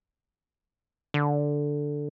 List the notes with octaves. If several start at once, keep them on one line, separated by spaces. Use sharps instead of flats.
D3